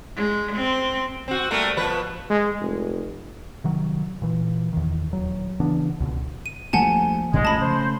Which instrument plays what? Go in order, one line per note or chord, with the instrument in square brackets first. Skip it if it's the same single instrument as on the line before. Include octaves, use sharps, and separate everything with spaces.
[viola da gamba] G#3
C4
[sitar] C4 F#4
G3 A3 A#3
B2 F3 B4
[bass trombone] G#3
F1
[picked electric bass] C3 D#3 F#3
A#2 E3
E2 D#3
D#1 F#3
C#3 E3 B3 D4
C#2 B2 D3
[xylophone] D#7
[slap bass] D2 G3 A3 [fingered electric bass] F3 A#3 [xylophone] F#5 G#5 A5
[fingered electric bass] E1 A#1 E2 [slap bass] B2 [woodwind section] G#3
[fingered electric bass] F3 [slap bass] A3 A#3 C#4 [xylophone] A5 B5
[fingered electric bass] C#3 [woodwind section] C5